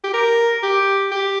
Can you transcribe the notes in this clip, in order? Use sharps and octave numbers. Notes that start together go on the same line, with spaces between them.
G4
A#4
G4
G4